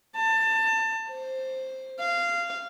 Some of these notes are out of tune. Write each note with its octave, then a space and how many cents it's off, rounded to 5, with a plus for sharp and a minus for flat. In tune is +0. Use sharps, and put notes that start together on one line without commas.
A5 +25
C5 +5
F5 -15